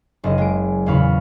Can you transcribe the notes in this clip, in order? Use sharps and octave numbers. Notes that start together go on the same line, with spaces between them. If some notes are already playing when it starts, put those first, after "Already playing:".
F#1 D#5
G#3 D7
E2 A#2 C#3 F5 B5 C#6